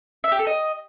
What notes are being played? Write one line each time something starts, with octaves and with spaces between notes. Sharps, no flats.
E5
G4
A4
D#5